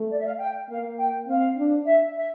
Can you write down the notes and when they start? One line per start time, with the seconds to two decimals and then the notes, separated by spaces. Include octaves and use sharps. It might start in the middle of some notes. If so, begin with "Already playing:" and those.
Already playing: A3
0.10 D5
0.18 E5
0.25 F5
0.39 G5
0.69 A#3 F5
0.98 G5
1.27 C4 F5
1.56 D4
1.85 E5
2.16 E5